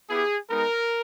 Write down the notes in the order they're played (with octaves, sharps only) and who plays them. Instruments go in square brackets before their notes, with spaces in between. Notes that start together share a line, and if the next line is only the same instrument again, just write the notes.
[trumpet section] B3 E4 G4 G#4
G#3 B3 D#4 A#4